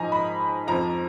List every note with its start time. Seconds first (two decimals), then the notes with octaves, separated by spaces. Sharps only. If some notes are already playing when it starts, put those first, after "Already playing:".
Already playing: G#2 F3 D#5 G#5 A#5
0.12 B5
0.67 F2 F3 A#5